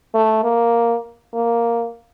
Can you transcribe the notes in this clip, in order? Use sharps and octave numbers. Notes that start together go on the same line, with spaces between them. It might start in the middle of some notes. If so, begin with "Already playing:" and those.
A3
A#3
A#3